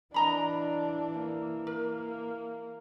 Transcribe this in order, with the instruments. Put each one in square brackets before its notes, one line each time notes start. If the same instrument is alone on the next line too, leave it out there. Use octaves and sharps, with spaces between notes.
[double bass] E3 [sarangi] D4 [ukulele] D#5 A#5 B5
[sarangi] A#3
[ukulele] A#4